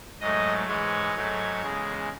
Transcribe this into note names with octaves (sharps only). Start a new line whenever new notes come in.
G#2 F#3 A3 D#5
G#2 E3 G#3 C#5
G#2 F#3 A3
E2 C#3 G#3